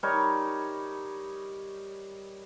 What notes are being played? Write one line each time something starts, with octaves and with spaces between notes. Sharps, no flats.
G3 D#4 A#4 C#5